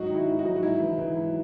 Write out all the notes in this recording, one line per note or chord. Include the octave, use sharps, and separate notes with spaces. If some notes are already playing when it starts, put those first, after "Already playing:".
Already playing: G#2 F#3 D#4 F#4
D#3
E4
G#2
D#4 F#4
F#3
F#4
G#2 E4
E3
E3
G#2